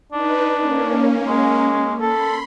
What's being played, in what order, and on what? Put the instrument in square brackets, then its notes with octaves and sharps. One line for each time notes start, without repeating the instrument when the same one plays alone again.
[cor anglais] D4 [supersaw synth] D#4 B4
[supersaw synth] A#3 C#4
[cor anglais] G#3
[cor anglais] A4 [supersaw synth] B5 C6